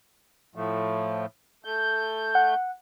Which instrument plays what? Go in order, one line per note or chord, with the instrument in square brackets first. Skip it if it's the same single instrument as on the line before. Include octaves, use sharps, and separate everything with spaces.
[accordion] A2 F3 A3
A3 G6
[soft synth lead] F#5